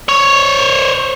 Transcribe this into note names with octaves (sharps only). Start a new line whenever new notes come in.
C5 C#5